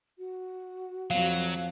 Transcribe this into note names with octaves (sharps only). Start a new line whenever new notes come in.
F#4
F2 F#3 F5